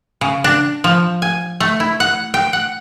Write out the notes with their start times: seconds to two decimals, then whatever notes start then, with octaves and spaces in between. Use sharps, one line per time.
0.21 C#3
0.44 D4
0.84 F3
1.22 G#5
1.60 A3
1.80 E4
2.00 F#5
2.34 G5
2.53 F#5